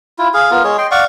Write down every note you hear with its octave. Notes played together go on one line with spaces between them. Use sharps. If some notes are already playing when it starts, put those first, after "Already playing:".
E4 F4
G#4 F5
B3 F4 A#4
G#3 G#4 C#5
D#5 G5 C6
D5 F5 F#5 C#6